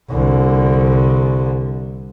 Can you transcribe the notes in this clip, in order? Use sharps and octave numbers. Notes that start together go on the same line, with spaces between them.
C2 D3